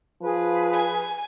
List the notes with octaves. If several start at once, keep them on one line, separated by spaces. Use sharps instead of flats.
F3 G#4 B4
G#5